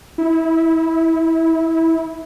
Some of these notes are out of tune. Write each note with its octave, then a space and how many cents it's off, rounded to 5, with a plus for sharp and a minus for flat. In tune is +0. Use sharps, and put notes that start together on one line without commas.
E4 -20